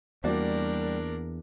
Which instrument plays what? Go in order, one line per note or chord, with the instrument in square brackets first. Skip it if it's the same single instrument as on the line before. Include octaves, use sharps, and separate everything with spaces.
[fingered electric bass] E2 [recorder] G3 [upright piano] A#3 F#4 D5 [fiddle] D4 A#4